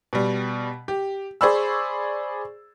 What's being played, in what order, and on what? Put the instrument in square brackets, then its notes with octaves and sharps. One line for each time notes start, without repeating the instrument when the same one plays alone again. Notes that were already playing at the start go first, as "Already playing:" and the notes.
[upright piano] B2 G3
G4
G#4 C5 D5 B5 C#6 E6